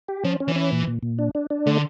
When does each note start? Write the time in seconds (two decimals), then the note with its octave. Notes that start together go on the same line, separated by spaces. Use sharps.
0.08 G4
0.24 F3 C#4
0.40 C#4
0.48 E3
0.56 C#4
0.72 A#2
0.87 A#2
1.03 A#2
1.19 D4
1.35 D4
1.50 D4
1.67 D3 A3